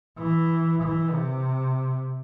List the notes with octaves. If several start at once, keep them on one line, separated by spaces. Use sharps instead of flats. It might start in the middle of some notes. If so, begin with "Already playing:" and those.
E3
E3
C3